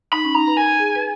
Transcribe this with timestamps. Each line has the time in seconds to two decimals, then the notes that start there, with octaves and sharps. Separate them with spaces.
0.12 D#4 B5
0.25 C#4
0.35 D#4 A#5
0.47 B4
0.57 A#4 G#5
0.79 G#4
0.95 B4